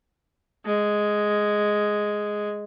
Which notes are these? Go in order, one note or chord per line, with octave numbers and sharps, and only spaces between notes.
G#3